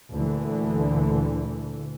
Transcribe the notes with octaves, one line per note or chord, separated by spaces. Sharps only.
D2 A#2 D3 E3